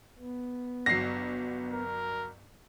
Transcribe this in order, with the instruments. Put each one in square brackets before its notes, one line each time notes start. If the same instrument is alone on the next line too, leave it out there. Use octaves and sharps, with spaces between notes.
[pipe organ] B3
[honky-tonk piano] G1 F#3 [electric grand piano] A#6 C7
[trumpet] A#4